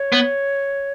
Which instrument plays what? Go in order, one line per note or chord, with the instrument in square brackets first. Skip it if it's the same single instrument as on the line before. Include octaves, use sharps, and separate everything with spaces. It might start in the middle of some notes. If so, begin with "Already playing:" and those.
Already playing: [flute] C#5
[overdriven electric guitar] B3